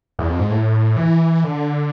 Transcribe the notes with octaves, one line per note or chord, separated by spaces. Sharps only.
E2
F2
G#2
A2
E3
D3